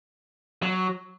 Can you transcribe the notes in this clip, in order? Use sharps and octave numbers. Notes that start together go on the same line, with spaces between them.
F#3